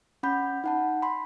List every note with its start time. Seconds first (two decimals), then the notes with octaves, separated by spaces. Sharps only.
0.23 C#4 F#5 B5 G6
0.64 D#4 F#5 A5
1.02 B5 C6